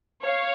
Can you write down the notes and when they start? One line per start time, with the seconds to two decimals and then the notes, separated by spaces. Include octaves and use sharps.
0.25 C#5 F5